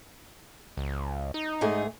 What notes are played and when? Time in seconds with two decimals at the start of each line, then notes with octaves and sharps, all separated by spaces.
0.77 C#2
1.34 D#4
1.61 G#2 A3 G#4